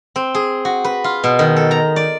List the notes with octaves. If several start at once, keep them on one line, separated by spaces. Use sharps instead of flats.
C4
G#4
F#4
B4
F4
B2
D#3
A4
A#5
D5